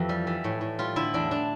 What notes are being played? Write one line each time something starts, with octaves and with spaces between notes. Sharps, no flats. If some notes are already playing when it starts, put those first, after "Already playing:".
Already playing: F2 E3 G4
G3
E3
A2
A2
G3 F4
D3 E4
E2 D4
D4